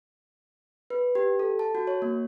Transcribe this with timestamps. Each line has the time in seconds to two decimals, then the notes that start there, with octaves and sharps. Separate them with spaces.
0.90 B4
1.15 G4
1.39 A4
1.59 A5
1.75 F#4
1.87 C#5
2.02 A#3